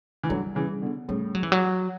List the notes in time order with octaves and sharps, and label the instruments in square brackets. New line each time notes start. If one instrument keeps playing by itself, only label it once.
[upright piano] E3
[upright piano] D3 F#3 [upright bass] G3
[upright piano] C#3 E3
B2 D3
[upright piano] A2 C#3 [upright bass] G3
[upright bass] F#3
E3
F#3